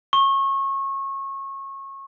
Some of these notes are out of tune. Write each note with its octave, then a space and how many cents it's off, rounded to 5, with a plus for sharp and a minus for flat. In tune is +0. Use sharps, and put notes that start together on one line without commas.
C#6 -25